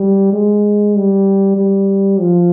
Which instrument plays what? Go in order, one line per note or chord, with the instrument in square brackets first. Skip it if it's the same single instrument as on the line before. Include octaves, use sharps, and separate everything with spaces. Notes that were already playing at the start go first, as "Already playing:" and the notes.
Already playing: [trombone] G3
G#3
G3
G3
F3